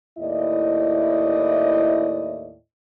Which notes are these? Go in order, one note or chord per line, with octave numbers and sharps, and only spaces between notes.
D#2 A2 E4 D5 D#5